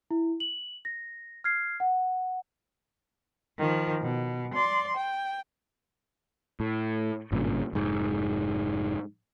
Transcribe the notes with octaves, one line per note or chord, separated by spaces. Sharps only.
E4
F#7
A#6
F6 G#6 C7
F#5
D#3 F3
B2
D5 C6
G5
A2
G#1 G2 A#2 C#3
F1 G#2